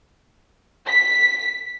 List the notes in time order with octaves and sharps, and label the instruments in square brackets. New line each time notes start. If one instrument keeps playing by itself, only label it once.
[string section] B6